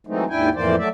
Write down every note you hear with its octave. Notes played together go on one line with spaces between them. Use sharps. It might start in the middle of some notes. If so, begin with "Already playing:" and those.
E3 F#3 G#3 A3 C4 D#4
D#2 G#2 D4 E4 G5 G#5
F2 A2 E3 A#3 C5 D5
F#3 A3 D5 E5